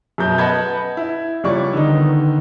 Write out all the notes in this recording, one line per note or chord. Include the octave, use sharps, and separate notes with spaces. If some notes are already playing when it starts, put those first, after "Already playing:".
F#2 B2 G6
B4 D#5 F#5 A5 B5 G#6
E4
C#2 G3 C#5 D5 C#6
D3 D#3 B3 D#4